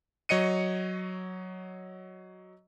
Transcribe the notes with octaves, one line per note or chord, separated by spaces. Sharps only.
F#3 C#5 D#5 C#7 D#7